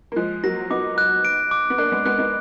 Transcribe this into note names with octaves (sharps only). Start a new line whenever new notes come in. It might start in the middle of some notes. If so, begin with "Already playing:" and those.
A#3
F3 G#3 F#6
F#3 A#3 A#6
B3 D#4 D6
F#6
D7
D6
B3
A#3 D4 F#6
G#3 B3
G#3 B3 F#6
B3 D#4